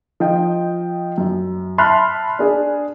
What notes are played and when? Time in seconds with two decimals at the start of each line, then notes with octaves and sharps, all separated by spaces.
0.20 F3 D#5 G5
1.18 F#2
1.78 E5 A5 B5 C6 F6 F#6
2.39 D4 G#4